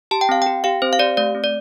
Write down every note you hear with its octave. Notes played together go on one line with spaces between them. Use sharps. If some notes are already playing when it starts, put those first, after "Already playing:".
G4 A5
G5
C4 F5
G4 G5
G4 F5
C4 C5
F5
G4 D5
A3 D5
C4
D5